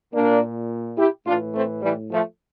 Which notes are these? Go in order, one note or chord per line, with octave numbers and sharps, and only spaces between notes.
A#2 A#3 D4
E4 G4
A2 E3 D4 F4
A3 C4
E3 G3
F3 A3